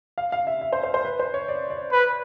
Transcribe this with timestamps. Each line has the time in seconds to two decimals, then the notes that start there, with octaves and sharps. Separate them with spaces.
0.18 F5
0.32 F5
0.47 E5
0.61 E5
0.73 C5
0.84 C5
0.94 C5
1.05 B4
1.19 C5
1.34 C#5
1.48 D5
1.70 D5
1.92 B4